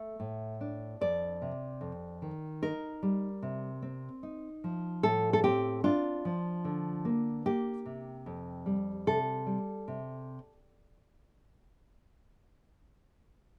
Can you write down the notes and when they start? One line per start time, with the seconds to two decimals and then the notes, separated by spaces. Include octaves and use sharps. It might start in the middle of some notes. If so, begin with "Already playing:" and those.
Already playing: A3
0.20 A2
0.61 D4
1.01 F2 D5
1.42 C3
1.81 F2
2.22 D#3
2.62 D#4 A#4
3.03 G3
3.42 C3
3.82 C4
4.23 D#4
4.64 F3
5.03 A2 A4
5.33 A4
5.44 C4 G4
5.84 D4 F4
6.25 F3
6.65 D3
7.05 A#3
7.46 A#3 G4
7.86 C3
8.26 F2
8.66 G3
9.07 C3 A4
9.46 G3
9.88 C3